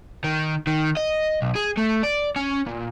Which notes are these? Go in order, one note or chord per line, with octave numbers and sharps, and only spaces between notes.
D#3
D#3
D#5
B1
G#4
A3
D5
C#4
A#2